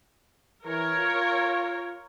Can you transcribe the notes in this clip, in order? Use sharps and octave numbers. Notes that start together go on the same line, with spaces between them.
E3 A#4 C#5
F4